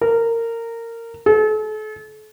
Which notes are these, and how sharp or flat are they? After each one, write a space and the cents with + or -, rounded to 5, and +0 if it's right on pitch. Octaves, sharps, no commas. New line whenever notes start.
A#4 -20
A4 -40